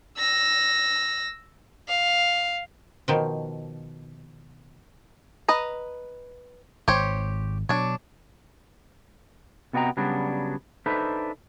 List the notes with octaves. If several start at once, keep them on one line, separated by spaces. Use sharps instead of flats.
E6 A#6
F5
B2 D#3 F3
B4 D#5 A#5
G#1 G4 C5 C#5
B2 F#3 D4 C#5
C3 B3 F#4 D#5 G5 A#5
C#3 F#3 G3 B3 D4 F#4
D4 D#4 A4 B4 C5 E5